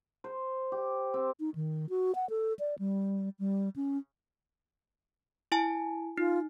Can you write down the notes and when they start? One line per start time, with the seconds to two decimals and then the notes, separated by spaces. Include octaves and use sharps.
0.24 C5
0.72 G4
1.14 C4
1.40 D#4
1.55 D#3
1.90 F#4
2.15 F#5
2.30 A4
2.59 D5
2.79 G3
3.39 G3
3.76 C#4
5.52 E4 G#5 A5
6.18 D#4 F4